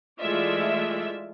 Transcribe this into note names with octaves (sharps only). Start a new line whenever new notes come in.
E3 G#3 A3 F4 D5 E5